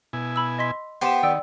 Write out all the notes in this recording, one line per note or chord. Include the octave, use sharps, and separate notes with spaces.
B2 E4 G#5
B5 E6
D#5 C6 B6
B3 G4 B4 C5 C6 E7
D#3 D5 G5 E6